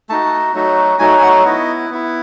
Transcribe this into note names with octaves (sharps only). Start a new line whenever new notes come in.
A3 D#4 F#4 A5
F#3 A3 D#4 F#4
F#3 A3 D#4 F#4 G#5
G#5
F#5
B3 E4 D#5
B3 E4